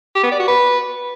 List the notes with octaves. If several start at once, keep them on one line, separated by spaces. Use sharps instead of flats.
G4
B3
D5
F#4
B4